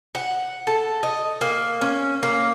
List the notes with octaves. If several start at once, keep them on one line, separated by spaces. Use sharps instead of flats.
F#5
A4
D#5
A#3
C#4
A#3